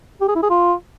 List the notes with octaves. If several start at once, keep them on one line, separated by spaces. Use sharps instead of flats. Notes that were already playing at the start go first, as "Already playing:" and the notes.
G4
G#4
E4
G#4
F4